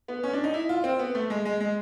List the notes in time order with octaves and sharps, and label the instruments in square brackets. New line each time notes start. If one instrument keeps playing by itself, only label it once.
[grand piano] B3
C#4
D4
D#4
E4
F4
C4
B3
A3
G#3
G#3
G#3